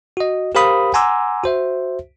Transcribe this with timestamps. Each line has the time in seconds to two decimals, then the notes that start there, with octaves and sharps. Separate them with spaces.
0.17 F#4 D#5
0.55 G4 A#4 C5 F5 B5 D#6
0.94 F#5 G#5 A#5 C6 D6 E6
1.44 F#4 C5 E5